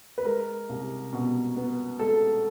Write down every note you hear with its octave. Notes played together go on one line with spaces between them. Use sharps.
B4
G#3 A#4
C2
B2
B3
G#3 A4